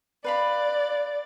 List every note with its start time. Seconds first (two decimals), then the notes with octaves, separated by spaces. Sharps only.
0.24 B4 D5 F5 B5